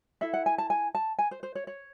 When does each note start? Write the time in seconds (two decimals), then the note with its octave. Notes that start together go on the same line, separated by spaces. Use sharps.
0.21 E4 A4 E5
0.34 F#5
0.46 G#5
0.58 A5
0.70 G#5
0.95 A5
1.19 G#5
1.31 C5
1.43 C5
1.55 C#5
1.67 C#5